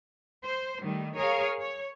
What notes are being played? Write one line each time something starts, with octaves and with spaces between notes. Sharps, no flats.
C5
D#3 G3 A3
G#4 A#4 C#5 F5
C#5